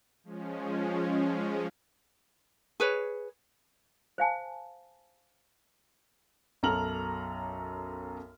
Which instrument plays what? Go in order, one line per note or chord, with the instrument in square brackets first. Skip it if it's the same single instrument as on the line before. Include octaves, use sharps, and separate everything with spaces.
[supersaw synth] F3 G#3 C#4
[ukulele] G#4 B4 C#5
[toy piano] C5 F5 G#5 A5
[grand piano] B1 F#2 A4 A#5 F6 F#7